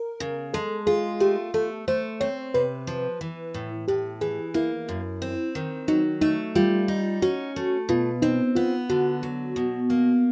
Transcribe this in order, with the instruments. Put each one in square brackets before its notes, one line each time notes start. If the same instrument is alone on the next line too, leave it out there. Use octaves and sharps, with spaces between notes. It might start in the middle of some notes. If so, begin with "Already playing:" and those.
Already playing: [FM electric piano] A#4
[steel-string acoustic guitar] C#3
[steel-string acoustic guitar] G#3 [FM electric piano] A4
[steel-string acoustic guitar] F4 [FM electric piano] G#4
[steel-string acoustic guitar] A3 [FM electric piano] G4
[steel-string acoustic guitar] A3 [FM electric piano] A4
[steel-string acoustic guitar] A3 [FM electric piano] C5
[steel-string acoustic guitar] C4 [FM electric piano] C#5
[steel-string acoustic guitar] C3 [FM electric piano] B4
[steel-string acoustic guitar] F3
E3
A2
[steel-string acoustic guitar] A2 [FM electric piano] G4
[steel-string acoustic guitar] E3 [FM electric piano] G#4
[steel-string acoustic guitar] A#3 [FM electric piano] E4
[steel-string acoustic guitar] F#2
C4
D#3
[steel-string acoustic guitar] F#3 [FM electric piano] D#4
[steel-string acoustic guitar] A3 [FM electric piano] D#4
[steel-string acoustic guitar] G3 [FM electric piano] F4
[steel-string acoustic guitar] D#4
[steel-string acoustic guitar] C#4 [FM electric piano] F#4
[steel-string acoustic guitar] A3
[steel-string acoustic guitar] B2 [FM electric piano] F4
[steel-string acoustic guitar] C4 [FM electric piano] D#4
[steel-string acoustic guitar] B3 [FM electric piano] F4
[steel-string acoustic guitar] D3 [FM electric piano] F#4
[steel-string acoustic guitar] F#3
B2
A#3